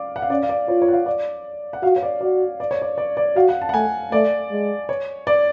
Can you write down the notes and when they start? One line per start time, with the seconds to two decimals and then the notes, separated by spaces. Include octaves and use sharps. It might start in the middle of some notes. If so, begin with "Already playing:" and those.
Already playing: D5 F5 D6
0.16 F#5
0.22 F5
0.30 C#4 D5
0.43 F5
0.49 D5
0.68 F4 C#5
0.82 C#5
0.88 F#5
0.93 F5
1.06 D5
1.73 F#5
1.83 F#4 F5
1.96 C#5
2.03 D5
2.21 F#4 D5
2.60 D5
2.71 C#5
2.82 D5
2.98 D5
3.17 D5
3.36 F#4 F5
3.49 F#5
3.62 A5
3.69 F#5
3.73 A3 G#5
4.12 A3 D5
4.51 G#3
4.89 C#5
5.27 D5